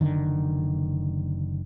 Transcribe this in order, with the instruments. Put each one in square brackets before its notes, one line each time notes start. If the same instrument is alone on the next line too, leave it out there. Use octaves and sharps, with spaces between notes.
[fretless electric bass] F#1 D3 D#3